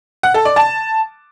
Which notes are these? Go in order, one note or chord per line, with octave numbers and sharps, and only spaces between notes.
F#5
A4
D5
A5